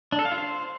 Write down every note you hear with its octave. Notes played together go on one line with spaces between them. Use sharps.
D4
A4
F5
F4
C5